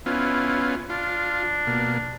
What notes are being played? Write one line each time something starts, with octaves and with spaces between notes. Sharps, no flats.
B3 C#4 E4 F4
D4 F4
B2 A#3